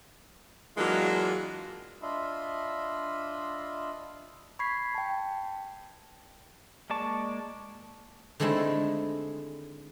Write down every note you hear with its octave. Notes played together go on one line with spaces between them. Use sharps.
E3 F#3 G#3 A#3 D4 F4
D4 F4 D#5 E5 B5 C6
B5 C#6 G#6 B6 C7
G5 A5
G#3 A#3 D5 A5 C#6
D3 D#3 G#3 A3 C4 E4